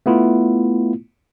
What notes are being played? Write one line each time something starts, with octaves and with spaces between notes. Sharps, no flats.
A3 B3 E4 F4